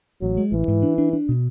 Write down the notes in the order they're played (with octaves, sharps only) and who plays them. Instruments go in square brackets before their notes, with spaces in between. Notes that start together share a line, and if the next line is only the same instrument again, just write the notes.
[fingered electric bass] A1 [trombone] F#3
[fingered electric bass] G#3
[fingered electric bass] A1 [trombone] E3
[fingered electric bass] G#2
D4
D4
D4
B2